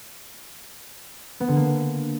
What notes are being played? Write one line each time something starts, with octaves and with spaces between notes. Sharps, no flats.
B3
D3
A#3